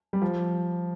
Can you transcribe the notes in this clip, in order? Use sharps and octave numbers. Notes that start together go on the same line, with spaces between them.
G3
F3